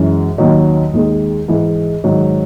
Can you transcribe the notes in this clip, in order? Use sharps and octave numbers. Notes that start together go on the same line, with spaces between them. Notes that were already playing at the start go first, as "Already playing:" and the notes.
Already playing: F#2 E3 G#3
D#2 D#3 F#3 D#5
D#2 D#3 G#3
G#2 E3 G#3
G#2 D#3 F#3